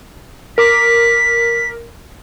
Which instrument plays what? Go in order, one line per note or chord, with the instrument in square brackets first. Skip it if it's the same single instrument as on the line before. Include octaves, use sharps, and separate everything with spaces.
[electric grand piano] A#4 D6 [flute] B6